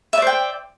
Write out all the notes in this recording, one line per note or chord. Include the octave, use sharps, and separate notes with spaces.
C5 D5 E5 G5